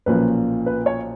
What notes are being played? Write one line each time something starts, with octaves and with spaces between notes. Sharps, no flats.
B1 A#2 F3 A#3 C#4 B4
B4
C#5